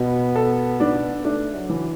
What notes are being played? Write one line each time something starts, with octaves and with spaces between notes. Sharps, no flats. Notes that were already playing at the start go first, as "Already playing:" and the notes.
Already playing: B2 B3
A4
D4
A3 D4
F#3
E3